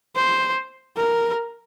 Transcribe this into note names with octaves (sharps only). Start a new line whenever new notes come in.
C5
A#4